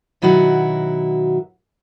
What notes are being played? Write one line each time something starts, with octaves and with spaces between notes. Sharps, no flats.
B2 D#3 F#3 E4 F#4